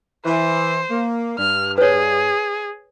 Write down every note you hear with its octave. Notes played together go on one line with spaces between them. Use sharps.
E3 C5
A#3
G2 F6
G#4 B4 C#5